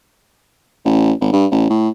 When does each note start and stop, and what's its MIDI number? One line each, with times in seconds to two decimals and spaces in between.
0.85 1.12 33
1.21 1.32 32
1.33 1.46 43
1.51 1.68 33
1.70 1.89 45